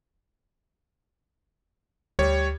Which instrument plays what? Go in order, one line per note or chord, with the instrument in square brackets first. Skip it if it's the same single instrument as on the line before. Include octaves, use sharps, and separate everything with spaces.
[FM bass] D2 [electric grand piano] G3 C#5